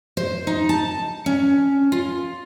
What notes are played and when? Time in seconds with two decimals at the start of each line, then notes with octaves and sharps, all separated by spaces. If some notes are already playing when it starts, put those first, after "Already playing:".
0.17 C5
0.47 D#4
0.69 A5
1.26 C#4
1.92 F4